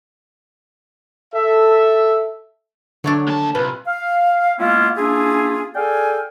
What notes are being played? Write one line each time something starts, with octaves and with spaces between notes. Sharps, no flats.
A4 E5
D3 F#3 A3 D4 C#5
D#2 A5
C2 A#2 B4
F5
G#3 A#3 B3 C#4 E4 F4
A#3 C#4 D4 E4 F4 G#4
G#4 A4 D5 F5 G5 G#5